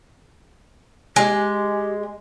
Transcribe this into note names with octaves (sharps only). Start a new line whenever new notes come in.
G#3 G4